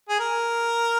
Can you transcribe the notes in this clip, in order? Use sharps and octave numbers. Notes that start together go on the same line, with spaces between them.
G#4
A#4